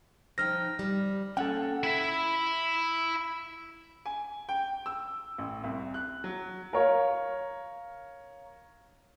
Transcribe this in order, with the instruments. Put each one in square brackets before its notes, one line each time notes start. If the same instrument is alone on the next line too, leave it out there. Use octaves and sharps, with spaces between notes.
[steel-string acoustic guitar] F3 D#4 G5 [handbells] F6 A#6
[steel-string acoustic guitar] G3
[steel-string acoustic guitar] A#3 C#4 [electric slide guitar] A4 F#5 G5
[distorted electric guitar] E4 E5
[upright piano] G#5
G5
E6
A1
C2
F#6
F#3
A#4 C#5 F5